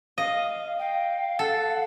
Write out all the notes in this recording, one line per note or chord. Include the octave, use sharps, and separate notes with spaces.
D#5 F5
F5 G5
A4 F#5